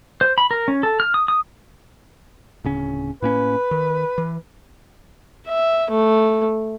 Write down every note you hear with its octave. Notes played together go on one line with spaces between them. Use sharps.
C5
B5
A#4
C#4
A4
F6
D#6
D#6
D1 C#3 C#4
A2 A#3 C#4 B4
D#3
E3
E5
A3